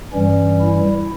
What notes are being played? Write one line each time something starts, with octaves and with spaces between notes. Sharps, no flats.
G2 E3 G3 C#4
E4